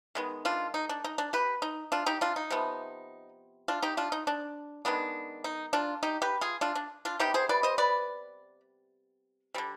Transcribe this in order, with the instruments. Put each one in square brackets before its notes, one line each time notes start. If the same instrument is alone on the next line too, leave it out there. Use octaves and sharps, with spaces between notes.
[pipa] D#3 G#3 B3
D4 F4
D#4
D4
D#4
D4
G4 B4
D#4
D4 F4
D#4 G4
D4 F4
D#4
C3 F3 B3
D4 F4
D#4 G4
D4 F4
D#4
D4
D#3 G#3 B3 D4
D#4
D4 F4
D#4 G4
G4 B4
F4 G#4
D4 F4
D4
D4 F4
C3 G3 B3 D#4 G4
G#4 C5
B4 D5
C5 D#5
B4 D5
D3 G3 C4